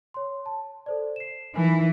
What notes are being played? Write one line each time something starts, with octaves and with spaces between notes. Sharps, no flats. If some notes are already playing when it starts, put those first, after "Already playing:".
C#5 C6
A5
A4 C5 D5
C7 E7
E3 D#4 A#4 G#5